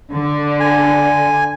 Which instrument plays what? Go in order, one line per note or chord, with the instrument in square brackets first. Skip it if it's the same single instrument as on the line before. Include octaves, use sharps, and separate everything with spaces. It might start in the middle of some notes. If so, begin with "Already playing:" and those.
[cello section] D3
[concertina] G#5